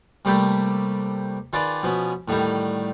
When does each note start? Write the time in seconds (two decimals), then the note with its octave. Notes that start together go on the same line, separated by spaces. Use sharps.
0.25 C3 G3 A3 A#3 G4 B4
1.53 D#3 F4 G#4 B4 D5
1.83 B2 F3 B3 C#4
2.28 A2 D3 D#3 G3